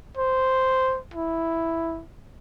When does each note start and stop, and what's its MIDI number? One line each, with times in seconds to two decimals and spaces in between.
0.17 0.99 72
1.14 2.02 64